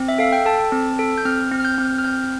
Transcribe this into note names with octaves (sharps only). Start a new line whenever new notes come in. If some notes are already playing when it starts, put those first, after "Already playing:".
Already playing: C4
E5
A4 F5
G5
A4 A5
C4
A4
G6
C4 F6
C4
F6
G6
C4
F6
C4 G6